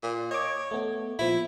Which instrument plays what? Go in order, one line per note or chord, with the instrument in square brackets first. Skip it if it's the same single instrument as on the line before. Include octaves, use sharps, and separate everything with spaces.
[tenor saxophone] A#2
[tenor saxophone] C#5 [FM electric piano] D#5 D6
[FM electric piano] A3 B3
[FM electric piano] A#2 F3 [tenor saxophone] E4